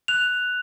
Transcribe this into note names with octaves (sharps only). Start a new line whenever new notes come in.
F#6 F7